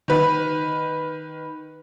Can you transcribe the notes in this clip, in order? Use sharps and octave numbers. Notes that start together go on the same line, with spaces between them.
D#3 B4